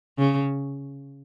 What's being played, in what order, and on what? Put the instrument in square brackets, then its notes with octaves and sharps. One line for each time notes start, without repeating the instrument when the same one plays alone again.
[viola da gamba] C#3